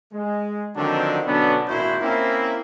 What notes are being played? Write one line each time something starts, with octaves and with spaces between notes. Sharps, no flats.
G#3
D3 D#3 F3 F#3 C4 D4
B2 D3 F#3 B3 C#4 D4
G#1 A#2 E4 F#4 C5
A#3 C4 C#4 E4